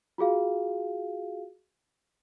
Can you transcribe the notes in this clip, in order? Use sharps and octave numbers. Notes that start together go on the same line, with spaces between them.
F4 F#4 G#4 F5